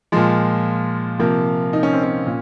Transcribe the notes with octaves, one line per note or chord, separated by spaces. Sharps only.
A#2 F3 G#3
C3 F3 A#3
D#4
C#4
C4
C#4
A#2